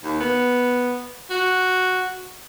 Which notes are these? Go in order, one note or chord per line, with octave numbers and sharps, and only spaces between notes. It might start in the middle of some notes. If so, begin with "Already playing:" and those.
D#2
B3
F#4